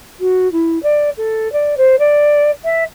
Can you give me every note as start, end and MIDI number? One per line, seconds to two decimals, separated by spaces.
0.20 0.51 66
0.52 0.81 64
0.83 1.10 74
1.17 1.51 69
1.53 1.75 74
1.77 1.96 72
1.99 2.51 74
2.65 2.84 76